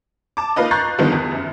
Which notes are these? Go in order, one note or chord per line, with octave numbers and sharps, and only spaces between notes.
A5 D6
A#3 D#4 F4 B4 D#5
A#5 C#6 F#6 G6 A6 C7
D3 D#3 F3 G3 B3 D#4
E2
F#2